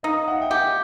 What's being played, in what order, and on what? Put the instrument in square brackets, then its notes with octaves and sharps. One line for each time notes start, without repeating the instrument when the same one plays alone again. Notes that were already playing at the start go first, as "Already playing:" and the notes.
[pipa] D#4 [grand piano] D#5 F5
[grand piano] E5 F#5
G5
[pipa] G4 [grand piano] F#5 G#5